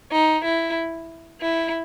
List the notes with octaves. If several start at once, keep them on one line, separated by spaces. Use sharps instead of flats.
D#4
E4
E4